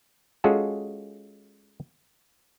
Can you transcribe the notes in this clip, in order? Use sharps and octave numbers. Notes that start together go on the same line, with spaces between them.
G#3 C#4 F4 F#4 G#4 A4